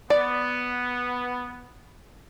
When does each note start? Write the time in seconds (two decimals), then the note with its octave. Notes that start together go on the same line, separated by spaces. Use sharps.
0.10 B3 D5